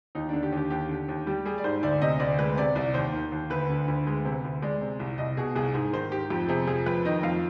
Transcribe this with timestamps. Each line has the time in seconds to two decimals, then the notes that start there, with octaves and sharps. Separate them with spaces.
0.15 D#2 D#4
0.29 D3 D4
0.43 G4
0.52 D#2
0.57 G4
0.70 D#2 G4
0.89 D3
1.08 D#2
1.27 G3 G4
1.45 G3 G#4
1.58 D5
1.64 G#2 C5
1.83 D2 D5
2.01 C3 D#5
2.20 D2 D5
2.39 G#3 B4
2.57 C3 D5
2.75 C2 D5
2.94 D#2 C5
3.13 D#3
3.32 D#2
3.50 D2 B4
3.69 D3
3.88 D2
4.07 G#3
4.25 C3
4.44 D2
4.62 G#3 D5
4.81 C3
5.00 C2
5.18 C2 D#5
5.37 B2 G#4
5.55 C2 G#4
5.74 G#2 G#4
5.93 D#3 C5
6.12 G#2 G4
6.30 F2 G4
6.49 C3 G#4
6.67 F2 G#4
6.86 F2 B4
7.05 D#3 D#5
7.23 F2 F5